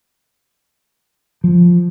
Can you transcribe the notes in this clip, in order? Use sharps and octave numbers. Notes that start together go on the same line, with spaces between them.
F3